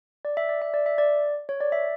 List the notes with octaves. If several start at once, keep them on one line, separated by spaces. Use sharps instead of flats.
D5
E5
D5
E5
D5
E5
D5
C#5
D5
E5